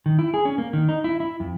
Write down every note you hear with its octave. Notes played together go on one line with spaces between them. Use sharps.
D#3
E4
G#4
C#4
A#3
D#3
D#4
E4
E4
F2